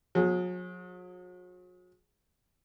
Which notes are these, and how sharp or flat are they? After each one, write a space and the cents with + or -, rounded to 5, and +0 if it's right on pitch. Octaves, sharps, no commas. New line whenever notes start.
F#3 -40 G#4 +0